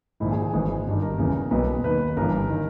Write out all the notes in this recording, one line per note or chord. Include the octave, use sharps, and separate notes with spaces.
A#1 G#2 D#3 E4
G#4
G#4
G#1 G#2 E3 A#4
G1 G2 D#3
A#4
E1 E2 C#3 E3
B1 B2 B4
D#2 D#3 B4
G1 G2 E3 A#4
D#3